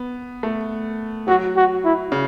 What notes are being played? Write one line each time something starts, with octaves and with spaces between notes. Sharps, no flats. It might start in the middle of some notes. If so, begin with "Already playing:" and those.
Already playing: B3
A3
F#3 F#4
F#4
E4
C#3